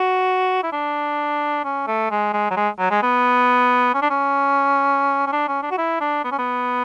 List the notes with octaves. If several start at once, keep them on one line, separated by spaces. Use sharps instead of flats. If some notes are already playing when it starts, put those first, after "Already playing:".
Already playing: F#4
E4
D4
C#4
A3
G#3
G#3
F#3
G#3
F#3
G#3
B3
C#4
D4
C#4
C#4
D4
C#4
D4
F#4
E4
D4
B3
C#4
B3